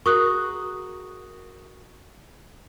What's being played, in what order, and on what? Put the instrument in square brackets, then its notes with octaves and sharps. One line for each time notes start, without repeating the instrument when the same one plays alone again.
[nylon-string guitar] F#4 G#4 A#4 [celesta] C#6 D#6 F#6